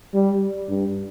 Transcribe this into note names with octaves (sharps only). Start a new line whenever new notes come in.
G3
G2